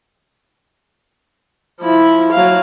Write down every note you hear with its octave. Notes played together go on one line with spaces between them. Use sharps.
F3 E4
F#3 F5